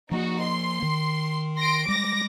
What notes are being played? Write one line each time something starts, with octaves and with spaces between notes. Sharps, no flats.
F3 A#3 D#4 F#4
C6
D#3
C6 A#6 D7
G3 G#3 D6 A#6